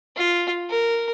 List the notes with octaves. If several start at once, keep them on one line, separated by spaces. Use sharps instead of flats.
F4
A#4